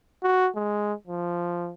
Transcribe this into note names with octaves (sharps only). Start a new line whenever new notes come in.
F#4
G#3
F3